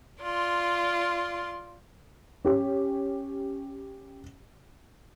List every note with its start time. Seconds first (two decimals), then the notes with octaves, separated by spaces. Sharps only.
0.20 F4 D5 C6
2.45 C#4 G4